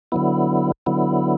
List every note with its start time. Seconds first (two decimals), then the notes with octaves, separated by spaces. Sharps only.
0.12 D3 F#3 B3 E4
0.86 D3 F#3 B3 E4